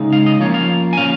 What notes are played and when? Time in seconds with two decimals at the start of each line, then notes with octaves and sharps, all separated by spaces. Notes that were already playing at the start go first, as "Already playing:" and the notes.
Already playing: C#3 G#3 D#4
0.13 F5
0.26 D#5
0.40 F3 A#3 C#4 F4 C#5
0.54 F5
0.93 G#5
0.97 A#2 F3 C#4 F5